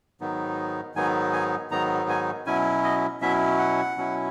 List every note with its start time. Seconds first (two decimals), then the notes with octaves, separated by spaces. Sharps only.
0.21 G#2 D#3 F#3 B3 D#4
0.95 G#2 D#3 F#3 B3 D#4 G#5
1.33 G#5
1.71 G#2 D#3 F#3 B3 D#4 A#5
2.09 G#5
2.46 B2 F#3 C#4 E4 G#5
2.84 D#5
3.21 B2 F#3 C#4 E4 E5
3.59 F#5
3.97 B2 F#3 C#4 E4